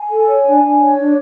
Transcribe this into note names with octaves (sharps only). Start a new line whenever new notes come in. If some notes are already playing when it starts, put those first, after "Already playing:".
Already playing: G#5
A4
C#5
D4
D4
C#5
D4